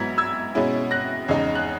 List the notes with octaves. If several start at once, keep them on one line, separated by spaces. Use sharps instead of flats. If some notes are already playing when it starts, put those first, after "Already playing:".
Already playing: G#2 F#3 B3 E4 G#6 B6
E6 G#6
B2 G#3 C#4 E4
F#6 A#6
E2 C#3 G#3 D#4
F#6